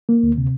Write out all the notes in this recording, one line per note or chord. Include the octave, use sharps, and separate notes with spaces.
A#3
D2
C3